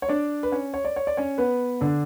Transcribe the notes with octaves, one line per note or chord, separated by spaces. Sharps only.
C#5
D4 D5
B4
C#4 C#5
C#5
D5
C#5
D5
C#4 C#5
B3 B4
D3 D4